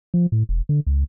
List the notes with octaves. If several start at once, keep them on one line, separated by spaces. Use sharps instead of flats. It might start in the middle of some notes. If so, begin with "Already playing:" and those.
F3
A2
E1
D3
C#2